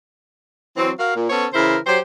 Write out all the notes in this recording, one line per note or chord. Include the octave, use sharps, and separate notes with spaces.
E3 F#3 C4
F#4 A#4 F5
A#2
B3 C#4 A4 C5 C#5
C#3 E3 E4 A#4 C5
F#3 G4 C5